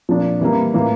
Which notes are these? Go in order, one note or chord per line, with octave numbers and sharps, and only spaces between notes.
A#2 F3 A#3 D4
E3 G3 A#3 E4
A2 E3 A#3 F4